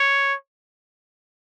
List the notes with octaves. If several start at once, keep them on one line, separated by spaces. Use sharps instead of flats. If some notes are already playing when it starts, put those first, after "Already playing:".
Already playing: C#5